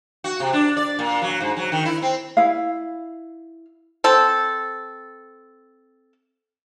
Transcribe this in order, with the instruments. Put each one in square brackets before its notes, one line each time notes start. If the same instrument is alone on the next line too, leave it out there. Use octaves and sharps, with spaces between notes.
[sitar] F#4
C3
D4
D5
A#2
F#3
G#2
F#3
D#3
E4
C4
[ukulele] E4 F5
[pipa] C4 A4